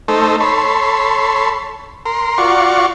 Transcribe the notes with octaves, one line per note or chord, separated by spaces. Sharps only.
A3 D#4 A4 C5
A4 C#5 B5 C6
A#4 C6
F4 F#4 D5 C#6